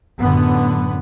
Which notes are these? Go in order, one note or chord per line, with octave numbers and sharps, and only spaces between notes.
F#2 A2 D3 B3